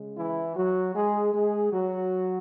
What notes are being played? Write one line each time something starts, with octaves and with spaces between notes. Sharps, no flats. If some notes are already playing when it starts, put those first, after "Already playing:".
Already playing: C#3 G#3
E3 E4
F#3 F#4
G#3 G#4
G#3 G#4
F#3 F#4